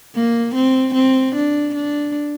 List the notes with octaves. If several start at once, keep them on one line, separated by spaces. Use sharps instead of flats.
A#3
C4
C4
D4
D4